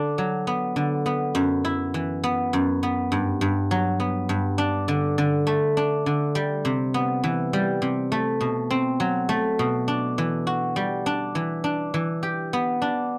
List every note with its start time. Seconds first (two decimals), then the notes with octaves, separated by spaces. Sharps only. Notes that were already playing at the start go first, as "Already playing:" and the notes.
Already playing: D3 D4
0.18 F#3
0.47 B3
0.76 D3
1.06 B3
1.35 F#2
1.65 E4
1.94 E3
2.24 B3
2.53 F#2
2.83 B3
3.12 G2
3.41 G2
3.71 F#3
4.00 B3
4.29 G2
4.58 D4
4.88 D3
5.18 D3
5.47 A3
5.77 D4
6.06 D3
6.35 G3
6.65 C3
6.94 B3
7.24 E3
7.53 G3
7.82 C3
8.12 A3
8.41 B2
8.71 C4
9.00 F#3
9.29 A3
9.59 B2
9.88 D4
10.18 E3
10.47 F#4
10.76 G3
11.06 D4
11.35 E3
11.64 D4
11.94 E3
12.23 G4
12.53 B3
12.82 D4